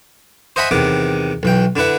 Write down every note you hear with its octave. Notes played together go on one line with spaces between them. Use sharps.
C5 D#5 E5 F#5 G#5 B5
E2 C3 D#3 F#5 D6
B1 E3 G5
D3 D4 E4 B4 F#5